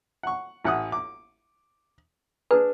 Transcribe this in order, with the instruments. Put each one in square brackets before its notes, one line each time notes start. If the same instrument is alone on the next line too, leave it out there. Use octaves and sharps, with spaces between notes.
[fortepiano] F#5 C#6
A1 F#5 D#6
D6
[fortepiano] D4 G#4 [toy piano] B4